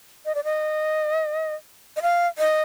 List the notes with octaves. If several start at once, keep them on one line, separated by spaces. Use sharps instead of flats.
D#5
D5
D#5
D#5
F5
D#5